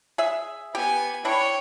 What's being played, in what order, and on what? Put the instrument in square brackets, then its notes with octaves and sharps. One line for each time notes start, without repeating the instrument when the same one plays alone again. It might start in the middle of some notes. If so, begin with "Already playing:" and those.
[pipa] G#4 E5
[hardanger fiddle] B3 G#5 [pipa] G4
[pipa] D4 E4 [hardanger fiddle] C#5 G5